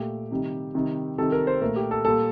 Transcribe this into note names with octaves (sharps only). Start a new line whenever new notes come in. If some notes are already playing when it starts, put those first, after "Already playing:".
Already playing: A#2 A3 G4
C3 D#3 G3
C3 D#3 G3
C3 D#3 G3 A4
A#4
C5
A#2 A3 A#4
G4
A4
A#2 G3 A4